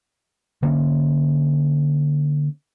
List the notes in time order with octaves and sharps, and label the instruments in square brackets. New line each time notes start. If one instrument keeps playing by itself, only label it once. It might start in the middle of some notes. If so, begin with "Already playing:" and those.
[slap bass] D3 A#3 C#4